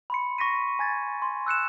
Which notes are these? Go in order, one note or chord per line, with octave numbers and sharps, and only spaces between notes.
B5 C6 C#7
C#6 A#6 B6 D#7
G#5 G#6 A6
C6
E6 F#6 C#7 E7